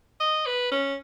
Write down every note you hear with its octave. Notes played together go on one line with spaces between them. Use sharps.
D#5
B4
C#4